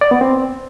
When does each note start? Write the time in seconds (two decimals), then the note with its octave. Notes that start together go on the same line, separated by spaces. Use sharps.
0.01 D5
0.11 B3
0.21 C4